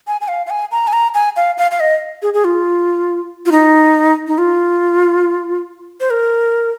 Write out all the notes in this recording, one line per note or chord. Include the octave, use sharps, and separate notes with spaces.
G#5
G#5
F5
F5
G#5
A#5
G#5
A#5
G#5
F5
F5
F5
D#5
G#4
G#4
F4
F4
D#4
D#4
F4
C5
A#4